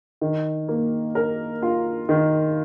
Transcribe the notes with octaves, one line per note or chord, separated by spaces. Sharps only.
D#3
A#3
A#4
F4
D#3